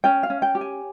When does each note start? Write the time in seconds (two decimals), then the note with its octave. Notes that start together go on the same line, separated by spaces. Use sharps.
0.04 C#4 G5
0.23 F5
0.30 C#4
0.42 G5
0.55 G4
0.61 G#5